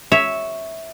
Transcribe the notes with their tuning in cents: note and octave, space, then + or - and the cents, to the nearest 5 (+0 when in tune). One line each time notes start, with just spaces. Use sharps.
C#5 +0 E5 -10